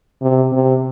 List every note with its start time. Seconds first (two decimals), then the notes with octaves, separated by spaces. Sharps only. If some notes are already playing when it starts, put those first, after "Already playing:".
0.22 C3
0.53 C3